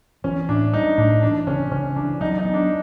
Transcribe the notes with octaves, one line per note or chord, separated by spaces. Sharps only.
E3 C#4
A2 D4
G3 D#4
A2 D4
E3 D4
C#3 C#4
C#3 C#4
E3 D4
F#3 D#4
D#4
B3
D4